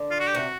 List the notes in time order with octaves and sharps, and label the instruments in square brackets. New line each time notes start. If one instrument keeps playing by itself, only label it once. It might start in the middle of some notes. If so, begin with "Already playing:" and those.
Already playing: [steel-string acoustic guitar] D3
[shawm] F4
F#4
G4
[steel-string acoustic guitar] C3 [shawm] F#4